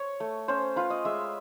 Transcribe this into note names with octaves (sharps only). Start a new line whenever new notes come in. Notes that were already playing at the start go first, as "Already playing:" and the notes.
Already playing: C#5
A3
C#4 C5
F4 B4
D#5
G#3 E5